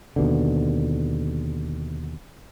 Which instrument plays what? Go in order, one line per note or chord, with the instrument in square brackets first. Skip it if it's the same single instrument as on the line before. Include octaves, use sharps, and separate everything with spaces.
[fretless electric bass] D#2 B2 D3